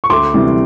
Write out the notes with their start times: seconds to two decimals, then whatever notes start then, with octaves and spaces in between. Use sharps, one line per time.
0.04 C#6
0.10 D2 C6 D6
0.34 C3 E3 G3